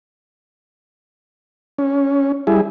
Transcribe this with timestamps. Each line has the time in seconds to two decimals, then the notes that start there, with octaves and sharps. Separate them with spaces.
1.78 C#4
2.47 G3 E4 G#4